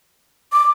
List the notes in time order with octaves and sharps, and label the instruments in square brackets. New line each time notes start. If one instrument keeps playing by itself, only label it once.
[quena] D6